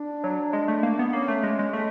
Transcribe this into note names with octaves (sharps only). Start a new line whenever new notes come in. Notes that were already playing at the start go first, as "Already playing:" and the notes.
Already playing: D4
F#3
G#3
A3
A#3
B3
A#3 C#4
A3
G#3
G#3
G#3 A3